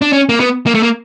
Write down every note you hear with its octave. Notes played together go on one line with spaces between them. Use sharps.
D4
C#4
A#3
B3
A#3
A3
A#3